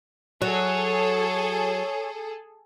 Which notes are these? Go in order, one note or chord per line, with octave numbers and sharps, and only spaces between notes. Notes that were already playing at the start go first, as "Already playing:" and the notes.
F#3 G#4 A4 C#5